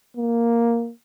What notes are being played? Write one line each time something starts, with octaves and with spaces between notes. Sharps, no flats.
A#3